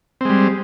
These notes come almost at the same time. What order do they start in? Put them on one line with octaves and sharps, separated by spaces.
C4 G#3 G3